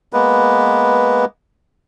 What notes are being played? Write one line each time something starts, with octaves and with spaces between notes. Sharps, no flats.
G#3 A#3 B3 B4